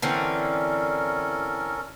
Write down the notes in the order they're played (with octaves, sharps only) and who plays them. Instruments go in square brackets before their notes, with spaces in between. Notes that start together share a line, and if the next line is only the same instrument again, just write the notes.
[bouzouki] D3 E3 C4 [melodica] C#4 A4 A#4